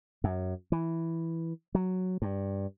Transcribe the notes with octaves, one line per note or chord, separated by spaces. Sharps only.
F#2
E3
F#3
G2